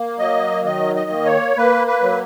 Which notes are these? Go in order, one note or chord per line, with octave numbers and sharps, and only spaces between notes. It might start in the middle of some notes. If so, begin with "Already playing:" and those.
Already playing: A#3
F#3 D#5
D#3 D#5
D#5
A#3
C#5
A#3 B4
B4
F#3